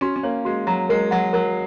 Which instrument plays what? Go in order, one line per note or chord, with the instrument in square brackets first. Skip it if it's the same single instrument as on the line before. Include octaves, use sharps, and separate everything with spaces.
[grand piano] C#4 [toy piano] F#4
[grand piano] C#4
[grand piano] A#3 [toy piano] C#5
[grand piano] G#3 [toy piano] F#4
[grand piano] F#3 [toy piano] A#5
[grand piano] G#3 [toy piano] A#4
[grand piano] F#3 [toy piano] F#5
[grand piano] F#3 [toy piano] A#4